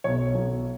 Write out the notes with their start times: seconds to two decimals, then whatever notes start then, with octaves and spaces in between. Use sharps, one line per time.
0.04 B1 B2 C#5
0.34 B1 B2